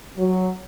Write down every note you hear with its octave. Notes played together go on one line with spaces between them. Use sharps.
F#3